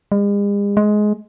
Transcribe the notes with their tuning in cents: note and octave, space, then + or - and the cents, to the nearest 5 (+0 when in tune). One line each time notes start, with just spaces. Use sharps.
G#3 -45
G#3 +15